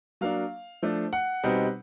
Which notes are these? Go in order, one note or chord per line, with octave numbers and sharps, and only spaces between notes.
F#3 A#3 D4 F5
F3 A3 D4
F#5
B2 G3 C4 D#4